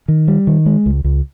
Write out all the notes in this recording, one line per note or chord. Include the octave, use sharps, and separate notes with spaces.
D#3
G3
D#3
G#3
C#2
C#2